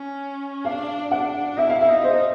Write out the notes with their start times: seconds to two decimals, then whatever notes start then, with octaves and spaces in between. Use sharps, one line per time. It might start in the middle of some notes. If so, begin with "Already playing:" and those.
Already playing: C#4
0.65 D4 F5
1.11 D4 F#5
1.57 E4 E5
1.69 F5
1.81 E5
1.89 D#4
2.04 C5